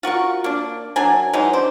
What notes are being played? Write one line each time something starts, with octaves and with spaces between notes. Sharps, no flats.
F4 F#4 A#4 C#6
A#3 D4
F#3 D4 A#4 G#5
E3 F#3 G#3 D#4
D4 C5